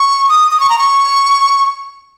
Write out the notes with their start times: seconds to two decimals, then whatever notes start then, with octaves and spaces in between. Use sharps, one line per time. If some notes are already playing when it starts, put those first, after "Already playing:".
Already playing: C#6
0.29 D#6
0.51 D#6
0.60 C#6
0.69 A#5
0.79 C#6